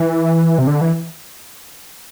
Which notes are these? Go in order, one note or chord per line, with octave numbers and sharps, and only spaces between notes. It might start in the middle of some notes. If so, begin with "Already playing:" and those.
Already playing: E3
C3
D3
E3